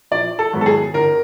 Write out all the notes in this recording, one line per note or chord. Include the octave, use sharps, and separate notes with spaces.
A#1 D5
A4
G#2 D#3 F#3 B3
A4
G#4
G1 A#4